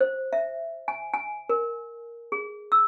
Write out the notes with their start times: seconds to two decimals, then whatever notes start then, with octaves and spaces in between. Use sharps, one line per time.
0.01 C5
0.33 E5
0.88 G#5
1.13 G#5
1.49 A#4
2.32 G#4
2.72 E6